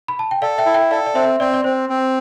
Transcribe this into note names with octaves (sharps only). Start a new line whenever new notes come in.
B5
A5
G5
A4 D5 F5
E5 G5
E4
E5 G5
A4 D5 F5
D5
C4 C5 E5
C4 D5
D5
C4 C5
C4